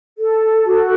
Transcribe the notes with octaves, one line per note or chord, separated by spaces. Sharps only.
A4
F#4